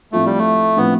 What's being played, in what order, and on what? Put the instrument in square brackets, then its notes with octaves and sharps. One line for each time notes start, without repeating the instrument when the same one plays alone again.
[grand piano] A2 F3 C4 F4 [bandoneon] A3
[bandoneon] G3
A3
[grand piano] A2 F3 C4 F4 [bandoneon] B3